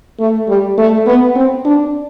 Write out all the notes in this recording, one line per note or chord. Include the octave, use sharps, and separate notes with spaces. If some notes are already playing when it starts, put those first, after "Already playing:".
A3
G3
A3
B3
C4
D4